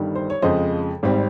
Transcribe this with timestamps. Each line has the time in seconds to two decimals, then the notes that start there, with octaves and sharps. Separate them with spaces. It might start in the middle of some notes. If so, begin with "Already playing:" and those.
Already playing: G1 G2 D#3 G3
0.15 C5
0.30 C#5
0.42 F2 C#3 F3 G#3 C5 D#5
1.03 G#1 G#2 G3 C4